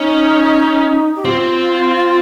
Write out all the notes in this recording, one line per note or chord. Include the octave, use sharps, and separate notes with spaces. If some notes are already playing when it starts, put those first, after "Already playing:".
Already playing: C#4 D#4
G4
C4 F4